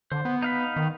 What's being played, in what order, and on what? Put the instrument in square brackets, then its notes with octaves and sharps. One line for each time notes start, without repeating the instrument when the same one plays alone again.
[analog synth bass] D3 [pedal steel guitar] C5
[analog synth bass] B3
[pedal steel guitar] D#4 F5 B5
[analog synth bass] D#3